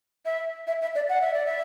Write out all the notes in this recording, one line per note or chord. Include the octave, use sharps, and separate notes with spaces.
E5
E5
E5
D5
F#5
E5
D5
E5